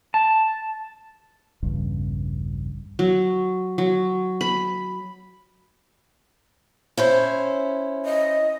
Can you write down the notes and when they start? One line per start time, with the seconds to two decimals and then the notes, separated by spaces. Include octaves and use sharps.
0.14 A5
1.63 A#1 E2 G2 C#3
2.99 F#3
3.78 F#3
4.41 B5
6.97 C#4 E4 C5
8.05 D#5